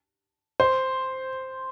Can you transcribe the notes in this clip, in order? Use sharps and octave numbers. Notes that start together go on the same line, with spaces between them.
C5